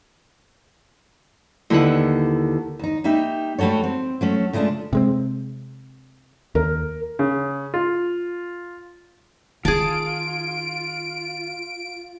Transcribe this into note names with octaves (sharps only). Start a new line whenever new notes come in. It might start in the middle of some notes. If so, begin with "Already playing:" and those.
D#2 D3 E4 B4 F#5
D#2 D#4
G3 A#3 D#4 G4 E5
G3 A3 F#4 A4 C#5
C4
F#3 A3 C#4
C#3 G#3 A3 B3 D4 F4
C3 G#3 C4
D#2 A#4
C#3
F4
D#3 D#4 F4 G#4 A5 D7